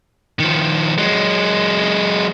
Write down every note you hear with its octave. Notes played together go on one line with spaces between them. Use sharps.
D#3 F3
F#3 G#3